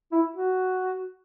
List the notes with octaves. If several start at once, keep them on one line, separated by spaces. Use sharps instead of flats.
E4
F#4